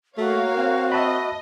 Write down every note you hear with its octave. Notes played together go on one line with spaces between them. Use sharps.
A3 A#3 F#4 C#5 F5
C4
D#5 E5 A5 B5